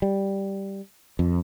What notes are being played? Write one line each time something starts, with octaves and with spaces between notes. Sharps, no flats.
G3
F2